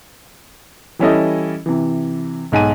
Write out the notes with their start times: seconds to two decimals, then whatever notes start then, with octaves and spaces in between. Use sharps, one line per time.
0.99 E3 G3 C#4 E4 A4 D#5
1.66 C3 E3
2.52 B1 G#2 G#5 D#7